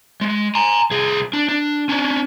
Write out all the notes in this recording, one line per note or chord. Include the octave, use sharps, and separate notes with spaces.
G#3
G#5 A#5
C2 G#4
D4
D4
C#4 D4